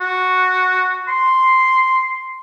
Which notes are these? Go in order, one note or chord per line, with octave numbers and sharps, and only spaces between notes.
F#4
C6